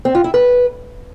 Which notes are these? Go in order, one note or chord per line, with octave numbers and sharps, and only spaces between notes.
C4
F4
E4
B4